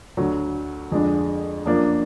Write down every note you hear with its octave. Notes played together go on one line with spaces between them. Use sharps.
D2 D3 F#3
F2 D3 G#3 D4
F#2 F3 A#3 D4